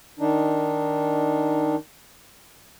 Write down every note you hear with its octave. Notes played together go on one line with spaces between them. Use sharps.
D#3 D4 D#4